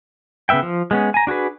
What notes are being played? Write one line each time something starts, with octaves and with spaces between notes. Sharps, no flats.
C#3 B3 B4 E5 G5
F3
G#3 B3 C#4
G#5 A#5
D4 F#4 G#4 B4